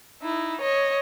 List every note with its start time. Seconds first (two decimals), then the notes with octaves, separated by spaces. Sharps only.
0.22 D#4 E4
0.61 C#5 D#5